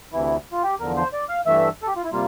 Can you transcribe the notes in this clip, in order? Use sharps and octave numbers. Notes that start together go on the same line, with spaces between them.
D2 C3 E3 E4
F4
G4
E2 D3 F3 A#4
C5
D5
F5
G2 E3 A3 E5
A4
G4
F4
E4
C3 G3 A#3 F4